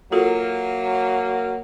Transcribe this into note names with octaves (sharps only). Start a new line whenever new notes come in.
F#3 A#3 F4 F#4 A4